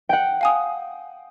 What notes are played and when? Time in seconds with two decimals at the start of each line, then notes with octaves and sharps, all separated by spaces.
0.09 F#5 G5
0.41 F5 G#5 D#6